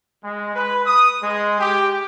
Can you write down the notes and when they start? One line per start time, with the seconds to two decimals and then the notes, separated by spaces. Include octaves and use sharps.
0.24 G#3
0.55 B4
0.86 D#6
1.22 G#3
1.60 G4